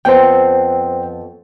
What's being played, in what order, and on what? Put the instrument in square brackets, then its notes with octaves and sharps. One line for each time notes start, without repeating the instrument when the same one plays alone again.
[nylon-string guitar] F2 B3 C4 [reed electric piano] C5 G5